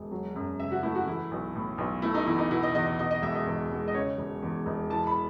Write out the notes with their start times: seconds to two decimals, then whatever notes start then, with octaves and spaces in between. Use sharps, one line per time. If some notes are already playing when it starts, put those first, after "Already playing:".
Already playing: E1
0.11 F#3
0.36 F#2
0.60 C#3 E5
0.71 F#4
0.83 A3 E4
0.95 F#4
1.06 E3 E4
1.31 B1
1.55 A2
1.78 B1
2.02 A3 E4
2.14 D#4
2.26 E2 E4
2.38 D#4
2.50 B2 E4
2.63 D#5
2.75 E2 D#5
2.86 D#5
2.99 B2 D#5
3.11 D#5
3.22 E1 E5
3.35 D#5
3.46 E2
3.71 G#3
3.88 D#5
3.94 C#3 C#5
4.18 E1
4.42 E2
4.66 E1
4.90 E3 A5
5.07 B5